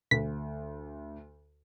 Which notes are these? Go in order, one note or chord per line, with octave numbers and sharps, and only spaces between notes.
D2 B6